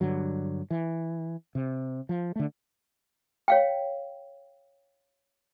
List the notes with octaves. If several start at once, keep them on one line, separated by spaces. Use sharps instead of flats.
G2 D3 F#3
E3
C3
F3
D3 A3
C#5 F5 G5